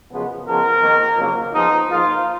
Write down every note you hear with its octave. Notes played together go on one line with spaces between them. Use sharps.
F#2 C#3 F3 G#3 B3
C#3 F3 G#3 B3 A#4
F2 D#3 A#3
F2 C#3 F#3 A#3
F2 F3 G#3 B3 D#4
G#2 F3 A#3 F4